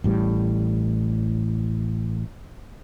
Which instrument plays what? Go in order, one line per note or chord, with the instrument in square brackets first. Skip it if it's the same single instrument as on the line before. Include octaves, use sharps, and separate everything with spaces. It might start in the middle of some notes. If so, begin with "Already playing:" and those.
[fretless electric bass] A1 A2 G3